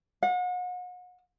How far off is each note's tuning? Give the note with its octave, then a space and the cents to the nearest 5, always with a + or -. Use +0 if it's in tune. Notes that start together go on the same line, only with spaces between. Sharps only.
F#5 -40